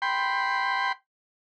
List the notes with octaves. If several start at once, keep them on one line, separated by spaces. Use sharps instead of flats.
G5 B5 C6